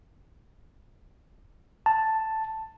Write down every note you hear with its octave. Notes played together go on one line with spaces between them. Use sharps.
A5